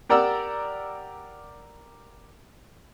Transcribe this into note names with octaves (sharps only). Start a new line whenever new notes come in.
G4 A#4 D5 F#5 A#5 E6